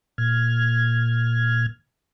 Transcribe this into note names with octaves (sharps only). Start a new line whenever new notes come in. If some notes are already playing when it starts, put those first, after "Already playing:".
A#2 F6 G#6